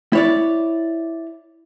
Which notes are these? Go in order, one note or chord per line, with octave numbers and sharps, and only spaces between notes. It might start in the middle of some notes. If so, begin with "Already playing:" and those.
E4 C#5 D5